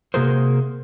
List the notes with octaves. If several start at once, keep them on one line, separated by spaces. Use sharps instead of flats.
C3 A#3 F#4 G#4 A#4 C5